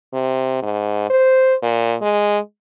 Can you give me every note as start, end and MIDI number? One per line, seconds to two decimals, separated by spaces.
0.13 0.61 48
0.63 1.08 44
1.10 1.55 72
1.63 1.96 46
2.02 2.39 56